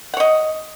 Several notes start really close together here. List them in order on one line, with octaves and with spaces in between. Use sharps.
F#5 C#5 D#5